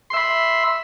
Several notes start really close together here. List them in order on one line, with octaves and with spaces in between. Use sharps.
C6 E5 B5